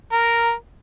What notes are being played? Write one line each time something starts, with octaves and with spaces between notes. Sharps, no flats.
A#4